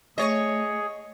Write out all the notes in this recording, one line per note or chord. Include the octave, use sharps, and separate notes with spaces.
A3 G#4 C#5 D#5